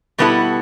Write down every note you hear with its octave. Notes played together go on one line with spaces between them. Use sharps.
B2 G3 B3 E4 A4